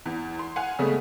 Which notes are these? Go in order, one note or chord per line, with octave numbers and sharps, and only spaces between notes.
E2
C6
F5 F#5 G#5
C#3 G#3 A3 B3